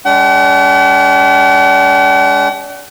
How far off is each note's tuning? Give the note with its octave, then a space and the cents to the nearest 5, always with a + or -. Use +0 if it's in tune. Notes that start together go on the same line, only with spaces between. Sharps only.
G#3 -10 D4 -40 F#5 +45